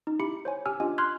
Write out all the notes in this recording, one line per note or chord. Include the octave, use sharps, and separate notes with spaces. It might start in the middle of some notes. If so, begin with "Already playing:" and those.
D#4
E4 G4 B5 C#7
C5 C#5 G#5
G4 G#5 E6 F6
D4 F4 G4 D#5 G#5
C6 F6 F#6 G#6